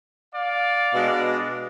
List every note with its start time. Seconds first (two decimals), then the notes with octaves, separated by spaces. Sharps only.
0.33 D5 F5
0.94 B2 G#3 D4